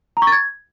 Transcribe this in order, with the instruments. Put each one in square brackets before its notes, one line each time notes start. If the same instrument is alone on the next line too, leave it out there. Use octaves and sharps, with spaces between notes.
[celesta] A#5
C#6
A6
G#6